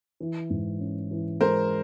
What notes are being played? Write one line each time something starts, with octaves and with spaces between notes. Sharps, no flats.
E3
G#2
C#4
E3
G#3 A#4 C5